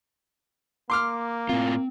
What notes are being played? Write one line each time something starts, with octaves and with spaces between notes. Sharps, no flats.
A#3 C6 D6 F6
A2 C4 F4